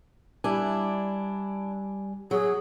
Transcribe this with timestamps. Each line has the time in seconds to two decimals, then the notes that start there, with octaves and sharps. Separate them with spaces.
0.44 G3 D4 E4 G#5
2.31 F#3 G#4